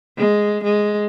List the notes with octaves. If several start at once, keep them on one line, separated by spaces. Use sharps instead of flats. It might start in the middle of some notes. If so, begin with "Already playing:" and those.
G#3
G#3